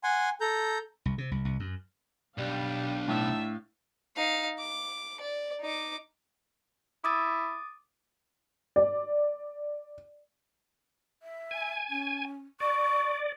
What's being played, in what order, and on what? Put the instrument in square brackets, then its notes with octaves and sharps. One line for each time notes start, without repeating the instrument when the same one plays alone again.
[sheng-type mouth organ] F#5 G#5 C6
A4 A#5 G6
[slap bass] C2
C3
C2
C2
F#2
[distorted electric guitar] B1 [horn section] G3 [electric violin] D4 F5
[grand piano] A2 [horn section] D#4 E5 A5
[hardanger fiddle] D#4 F5
D6
D5
D#4 D6
[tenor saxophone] E4 [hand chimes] D6 D#6 A6
[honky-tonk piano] D5
[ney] E5
[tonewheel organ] G#5
[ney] C#4
[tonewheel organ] D5 [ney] C#6